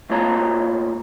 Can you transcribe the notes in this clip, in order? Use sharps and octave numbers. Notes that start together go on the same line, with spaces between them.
G#2 A#3 F4 C#5 A5 A#5